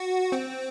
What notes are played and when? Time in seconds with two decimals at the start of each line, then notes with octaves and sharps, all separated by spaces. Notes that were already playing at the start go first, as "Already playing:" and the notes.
Already playing: F#4
0.32 C4